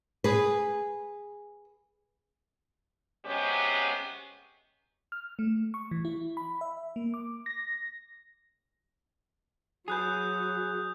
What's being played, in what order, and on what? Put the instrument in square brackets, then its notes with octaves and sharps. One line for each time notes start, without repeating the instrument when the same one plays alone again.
[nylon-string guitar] G#4 B4
[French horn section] C3 F#3 G#3 B3 C#4 G4
[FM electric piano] F6
A3
C#6
E3
E4
B5
E5
A#3
D6
A#6
[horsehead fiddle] F#3 [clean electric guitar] G#4 B4 [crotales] D#6 F#6 G6